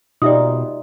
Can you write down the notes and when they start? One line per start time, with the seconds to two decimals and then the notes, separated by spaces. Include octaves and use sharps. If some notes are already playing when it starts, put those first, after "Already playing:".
0.22 B2 D#4 F4 G4 D5 E5 D#6